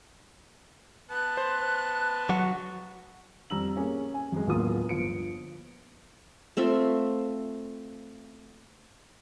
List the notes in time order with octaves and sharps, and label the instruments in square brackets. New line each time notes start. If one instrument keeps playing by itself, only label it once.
[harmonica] B3 A5 [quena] F#6
[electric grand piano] C5
[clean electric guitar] F#3 F#4
[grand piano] F2 G3 A#5 E6 F#7
A#3 C#4 G#4
G#5
F#2 G#3
D1 E2 F#3 A#3 F4 D#6
G1 F3 C#7 D7
[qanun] A3 C4 F4 E5